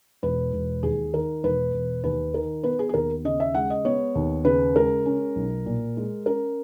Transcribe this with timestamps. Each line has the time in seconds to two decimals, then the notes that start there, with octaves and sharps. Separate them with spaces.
0.23 E1 B4
0.53 E1
0.83 D#2 G#4
1.13 D#3 A#4
1.43 E1 B4
1.73 E1
2.04 D#2 B4
2.34 D#3 A#4
2.64 B3 B4
2.79 G#4
2.89 G#4
2.94 D#2 A#4
3.25 C#3 D#5
3.40 E5
3.55 G#3 F#5
3.70 D#5
3.85 B3 C#5
4.15 D#2
4.45 C#3 B4
4.75 G#3 A#4
5.06 C#4
5.36 B1
5.66 A#2
5.97 G#3
6.26 C#4 A#4